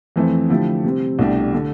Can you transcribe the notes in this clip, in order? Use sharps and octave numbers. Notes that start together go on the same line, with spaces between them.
F2 E3 A3 C4
D3 F3 A3 E4 G4
C3 G3 C4
C2 B2 A3 D4 G4
D3 A3